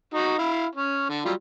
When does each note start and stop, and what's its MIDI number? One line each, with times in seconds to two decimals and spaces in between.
0.14 0.38 63
0.14 0.38 66
0.39 0.66 64
0.39 0.66 77
0.75 1.08 61
1.09 1.25 50
1.25 1.33 54
1.25 1.33 55
1.25 1.33 65